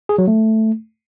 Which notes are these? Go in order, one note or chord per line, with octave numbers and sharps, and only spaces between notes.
G#4
F#3
A3